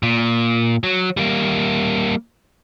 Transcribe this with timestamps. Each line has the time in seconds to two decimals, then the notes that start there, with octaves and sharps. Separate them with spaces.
0.03 A#2
0.83 F#3
1.17 G3 A#3